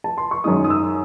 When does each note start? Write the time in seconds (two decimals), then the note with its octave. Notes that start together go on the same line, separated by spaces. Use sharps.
0.04 A5
0.18 C6
0.31 C#6
0.44 F#2 D#3 G#3 D#4 D#6
0.64 D#6
0.70 E6